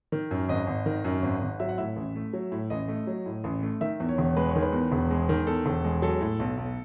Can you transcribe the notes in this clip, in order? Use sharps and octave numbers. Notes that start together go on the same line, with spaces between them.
D#3
F#2
G#1 D#5
G#1
D#3
F#2
G#1
G#1
F#3 E5
F#5
A2 E5
A1
A3
F#3
A2
A1 D#5
A3
F#3
A2
A1
A3
D#3 E5
E2
C#5
E1
G#3 B4
C#5
D#3
B4
E2
E1
G#3
D#3
E2 A4
E1
G#3
F#3 A4
A2
B1
B1